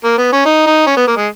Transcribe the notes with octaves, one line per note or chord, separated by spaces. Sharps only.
A#3
B3
C#4
D#4
D#4
C#4
B3
A#3
G#3